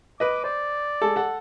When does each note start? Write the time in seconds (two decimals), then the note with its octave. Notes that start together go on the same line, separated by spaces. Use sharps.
0.20 B4 D#5 D6
0.44 C5 D5
1.02 G#3 A4
1.16 A4 F#5